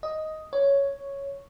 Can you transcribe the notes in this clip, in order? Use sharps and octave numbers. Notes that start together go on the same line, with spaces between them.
D#5
C#5